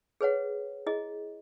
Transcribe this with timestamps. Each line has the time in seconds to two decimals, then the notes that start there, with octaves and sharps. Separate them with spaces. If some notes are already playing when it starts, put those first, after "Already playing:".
0.21 G#4 B4 C#5 F#5
0.87 E4 G#4 D#5